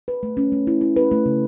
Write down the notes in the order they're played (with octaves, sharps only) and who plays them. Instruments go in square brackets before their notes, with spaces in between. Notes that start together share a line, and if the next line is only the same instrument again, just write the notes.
[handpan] B4
A3
C#4
A3
E4
E4
B4
A3
C#3